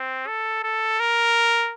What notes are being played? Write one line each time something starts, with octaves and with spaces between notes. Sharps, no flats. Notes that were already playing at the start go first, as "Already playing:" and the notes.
Already playing: C4
A4
A4
A#4